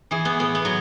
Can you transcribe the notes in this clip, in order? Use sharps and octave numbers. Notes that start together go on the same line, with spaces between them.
E3 G#4
B3
A2 B3
B3
F#3